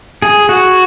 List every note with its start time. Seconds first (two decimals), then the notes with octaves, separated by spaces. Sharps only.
0.22 G#4
0.49 F#4